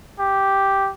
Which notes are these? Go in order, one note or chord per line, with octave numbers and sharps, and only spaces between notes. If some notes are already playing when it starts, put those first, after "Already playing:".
G4